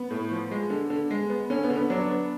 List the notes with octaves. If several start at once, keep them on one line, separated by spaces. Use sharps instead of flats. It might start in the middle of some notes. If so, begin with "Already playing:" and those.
Already playing: B3
A2
F3
G#3
D3
D3
G#3
B3
D3 C#4
B3
D3
B3
F#3 D4
B3